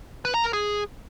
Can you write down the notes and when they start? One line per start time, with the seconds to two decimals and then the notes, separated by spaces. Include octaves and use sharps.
0.25 B4
0.34 A#5
0.44 A#4
0.53 G#4